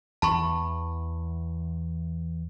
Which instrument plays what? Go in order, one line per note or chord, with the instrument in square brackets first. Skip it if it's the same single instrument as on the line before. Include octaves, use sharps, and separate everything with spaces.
[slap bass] E2 E3 [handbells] A5 B5 C#6